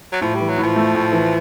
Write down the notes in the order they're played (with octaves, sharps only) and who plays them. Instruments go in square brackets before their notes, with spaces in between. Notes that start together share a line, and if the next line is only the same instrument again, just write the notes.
[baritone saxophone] F#3
[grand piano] A2 [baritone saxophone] F3
[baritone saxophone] G3
[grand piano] E3
[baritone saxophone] F#3
[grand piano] A2 [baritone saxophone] F3
[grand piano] A3
A2
E3